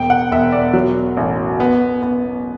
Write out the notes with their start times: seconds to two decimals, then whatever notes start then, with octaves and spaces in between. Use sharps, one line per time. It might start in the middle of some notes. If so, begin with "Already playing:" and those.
Already playing: E1 G5
0.10 F#5
0.31 E1 E5
0.52 D5
0.74 F#3
1.17 A1
1.60 B3
2.02 B3